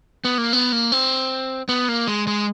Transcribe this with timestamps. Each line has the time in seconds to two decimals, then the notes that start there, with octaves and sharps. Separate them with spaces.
0.25 B3
0.38 A#3
0.53 B3
0.72 A#3
0.92 C4
1.69 B3
1.88 A#3
2.08 G#3
2.27 G#3